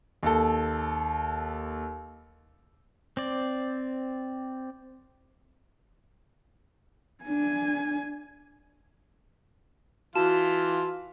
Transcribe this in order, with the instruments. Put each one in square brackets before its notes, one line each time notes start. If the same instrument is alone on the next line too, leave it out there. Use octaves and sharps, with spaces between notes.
[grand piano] D#2 A4
[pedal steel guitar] C4 D5
[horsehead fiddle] D4 G#5
[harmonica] E3 F4 [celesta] F#4 A5 E7